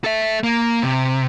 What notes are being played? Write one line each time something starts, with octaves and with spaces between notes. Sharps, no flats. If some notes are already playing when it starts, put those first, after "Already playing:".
A4 E5
A#3
C3